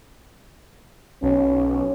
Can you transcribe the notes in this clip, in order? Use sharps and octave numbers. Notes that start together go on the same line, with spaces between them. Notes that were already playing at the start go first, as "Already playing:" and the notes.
B1 C#4